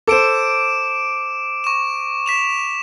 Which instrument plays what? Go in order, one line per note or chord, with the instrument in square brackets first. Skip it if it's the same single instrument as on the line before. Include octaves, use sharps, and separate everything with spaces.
[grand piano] A4 C5 [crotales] D6 D7 E7
[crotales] C#6 E7
B6 E7 F7